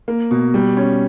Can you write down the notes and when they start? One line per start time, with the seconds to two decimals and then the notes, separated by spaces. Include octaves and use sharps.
0.08 A#3
0.31 B2
0.54 G3
0.77 C#4